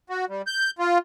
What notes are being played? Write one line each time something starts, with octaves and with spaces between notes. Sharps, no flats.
F#4
G3
G6
F4